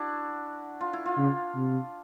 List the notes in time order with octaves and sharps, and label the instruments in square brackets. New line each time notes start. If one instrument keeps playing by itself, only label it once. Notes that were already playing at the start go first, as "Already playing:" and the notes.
Already playing: [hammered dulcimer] D4 E4 F#4
F4
E4
F4
[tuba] C#3
C3